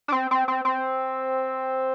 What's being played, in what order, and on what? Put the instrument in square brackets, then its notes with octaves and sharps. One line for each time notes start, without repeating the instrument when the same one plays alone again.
[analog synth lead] D4
C4
C4
C4
C4